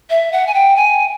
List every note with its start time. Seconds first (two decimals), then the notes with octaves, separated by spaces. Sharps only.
0.10 E5
0.32 F#5
0.47 G#5
0.54 G5
0.76 G#5